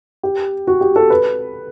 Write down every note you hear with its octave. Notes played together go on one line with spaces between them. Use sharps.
G4
F#4
G4
A4
B4